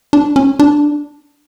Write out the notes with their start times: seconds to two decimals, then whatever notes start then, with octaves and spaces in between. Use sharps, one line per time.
0.13 D4
0.36 C#4
0.59 D4